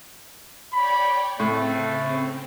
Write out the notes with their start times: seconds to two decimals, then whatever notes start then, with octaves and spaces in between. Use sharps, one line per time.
0.73 C#5 D5 G5 B5
1.40 A2 C#3 A3 C4